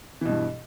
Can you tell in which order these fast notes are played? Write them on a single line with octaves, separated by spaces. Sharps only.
E3 B2 G2